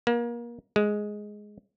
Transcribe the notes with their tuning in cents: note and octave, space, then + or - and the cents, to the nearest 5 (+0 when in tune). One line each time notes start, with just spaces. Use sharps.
A#3 +30
G#3 +5